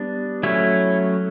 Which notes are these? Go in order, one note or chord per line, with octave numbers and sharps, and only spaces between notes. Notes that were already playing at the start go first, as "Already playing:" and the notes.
Already playing: G3 B3 D4
F#3 A3 C#4 E4